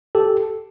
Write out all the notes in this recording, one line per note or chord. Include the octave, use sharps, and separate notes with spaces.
G4 A4